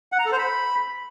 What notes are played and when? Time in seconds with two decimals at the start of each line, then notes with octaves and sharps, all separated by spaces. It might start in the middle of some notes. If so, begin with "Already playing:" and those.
0.12 F#5
0.19 A#5
0.25 A4
0.32 C5
0.39 B5